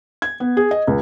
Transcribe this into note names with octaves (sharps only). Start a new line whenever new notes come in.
G#6
B3
G#4
D#5
C#2